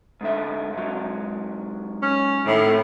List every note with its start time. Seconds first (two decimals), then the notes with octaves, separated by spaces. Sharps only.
0.21 G#2 D3 E5
0.73 G#2 F#3
2.02 C#4
2.46 A2 D#3
2.64 C3 A3